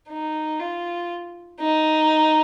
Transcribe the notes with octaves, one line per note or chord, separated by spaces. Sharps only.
D#4
F4
D#4